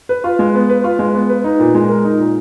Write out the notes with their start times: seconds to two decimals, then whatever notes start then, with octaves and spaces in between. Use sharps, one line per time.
0.09 B4
0.24 F4
0.39 G#3
0.54 B3
0.69 B4
0.84 F4
0.99 G#3
1.14 B3
1.29 B4
1.44 D#4
1.59 A#2
1.75 G#3
1.89 A#4
2.04 D#4
2.19 A#2